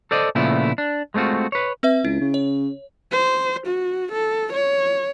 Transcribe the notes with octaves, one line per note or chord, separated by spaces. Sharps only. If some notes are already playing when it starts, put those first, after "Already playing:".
A4 C5 D5 D#5
A#2 C#3 F3 A3 B3 E4
D4
G#3 A3 C4 F4 F#4
B4 C#5
C4 B4 E5
C#2 E4
C#3
C#5
C5
F#4
A4
C#5